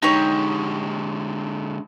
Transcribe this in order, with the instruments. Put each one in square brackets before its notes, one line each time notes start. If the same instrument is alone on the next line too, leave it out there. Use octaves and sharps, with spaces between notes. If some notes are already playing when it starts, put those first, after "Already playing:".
[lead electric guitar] D3 G#3 [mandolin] D#4 G4 C#5